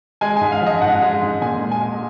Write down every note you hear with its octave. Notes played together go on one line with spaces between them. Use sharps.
G#3 G#5
G#2 G#5
F5
F3
D#5
G#2 F#5
G#3
G#2
A#2 G#5
G#3
G#5
G#3